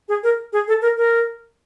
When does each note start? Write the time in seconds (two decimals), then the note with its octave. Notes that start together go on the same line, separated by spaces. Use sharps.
0.09 G#4
0.23 A#4
0.53 G#4
0.68 A4
0.82 A#4
0.97 A#4